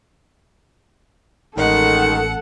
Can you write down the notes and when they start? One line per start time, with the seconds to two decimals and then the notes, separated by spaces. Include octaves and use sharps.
1.57 A1 D#3 G#3 A4 F#5